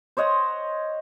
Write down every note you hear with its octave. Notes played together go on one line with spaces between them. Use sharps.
C5 C#5 D#5 F#5